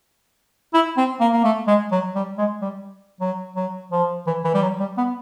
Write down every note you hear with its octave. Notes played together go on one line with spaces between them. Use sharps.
E4
C4
A#3
A#3
A3
G#3
F#3
G3
G#3
G3
F#3
F#3
F3
E3
E3
G3
F#3
G3
B3